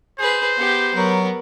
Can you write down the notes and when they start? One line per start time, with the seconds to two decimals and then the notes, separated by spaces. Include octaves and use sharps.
0.19 G#4 B4 C5
0.57 B3 G4
0.95 F#3 B3 A#4